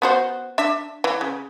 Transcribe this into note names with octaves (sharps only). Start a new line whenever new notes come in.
B3 F#4 C5
D4 E5
E3
C#3